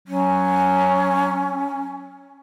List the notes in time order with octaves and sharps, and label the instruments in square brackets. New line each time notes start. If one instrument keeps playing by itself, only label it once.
[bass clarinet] F#3 [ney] C#4